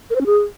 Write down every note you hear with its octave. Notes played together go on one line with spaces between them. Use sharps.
A#4
C5
C#4
G#4